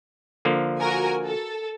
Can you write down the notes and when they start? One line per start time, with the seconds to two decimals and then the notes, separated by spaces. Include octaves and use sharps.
0.45 D3 F3 A#3
0.79 F#4 A#4 G#5
1.25 A4